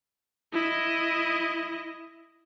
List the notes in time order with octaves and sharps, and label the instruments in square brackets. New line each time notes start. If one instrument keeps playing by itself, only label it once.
[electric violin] E4 D#5